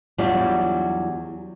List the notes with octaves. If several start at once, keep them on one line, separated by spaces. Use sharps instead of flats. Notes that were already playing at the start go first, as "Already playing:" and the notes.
E2 F#3 G3 D4 F4 D5